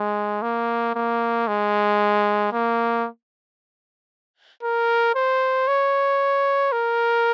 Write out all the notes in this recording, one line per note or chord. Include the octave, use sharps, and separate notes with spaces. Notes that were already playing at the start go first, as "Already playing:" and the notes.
Already playing: G#3
A#3
A#3
G#3
A#3
A#4
C5
C#5
A#4